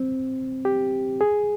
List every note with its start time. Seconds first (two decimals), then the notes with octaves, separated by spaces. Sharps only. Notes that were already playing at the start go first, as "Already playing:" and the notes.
Already playing: C4
0.65 G4
1.21 G#4